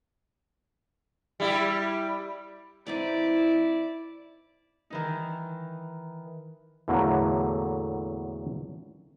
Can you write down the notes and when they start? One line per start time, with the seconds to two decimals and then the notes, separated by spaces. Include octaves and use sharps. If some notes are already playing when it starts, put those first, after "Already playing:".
1.40 G3 E4 G4
2.87 E3 C4 D#4 E4 D5
4.90 D#3 E3 D#4
6.88 E2 A2 D3 F#3 A#3